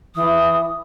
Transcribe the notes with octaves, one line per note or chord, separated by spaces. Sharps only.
E3 D#6